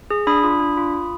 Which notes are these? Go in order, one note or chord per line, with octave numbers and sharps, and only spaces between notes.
G#4
D4 B5 D#6
F4
D4
F4
F4